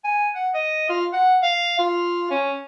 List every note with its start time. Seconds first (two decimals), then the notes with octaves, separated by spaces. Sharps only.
0.05 G#5
0.35 F#5
0.54 D#5
0.89 F4
1.13 F#5
1.43 F5
1.79 F4
2.31 C#4